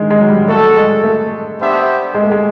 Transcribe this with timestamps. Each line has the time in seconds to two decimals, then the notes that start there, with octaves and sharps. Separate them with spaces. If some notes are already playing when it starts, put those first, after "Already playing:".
Already playing: D3 D#3 G#3
0.10 G#3
0.20 F#3
0.30 G3
0.48 A3 D4 F#4 A4
0.76 G#3
1.04 A3
1.60 B3 D4 G4 C5 E5
2.15 G#3
2.23 A3
2.32 G#3